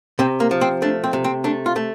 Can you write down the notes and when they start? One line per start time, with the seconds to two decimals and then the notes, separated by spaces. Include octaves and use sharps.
0.19 C3 C4
0.40 A#3
0.51 F3
0.61 C4
0.82 A3 D4
1.04 C4
1.13 C3
1.24 C4
1.44 A3 D4
1.66 F4
1.76 A3